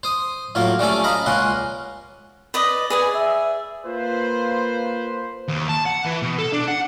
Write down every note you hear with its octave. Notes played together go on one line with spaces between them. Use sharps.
C5 D#6
A2 F#3 A#3 F4
G3 A3 C#4 A4
D#5 F5 A#5 B5
C#2 A#3 C#4 F#5 C6
B4 D5 D#5
G#4 B4 D5 G#5
E5
A#3 F4 B4 C5
D#2
A5
F#5
E3
B2
A4
D4
F#5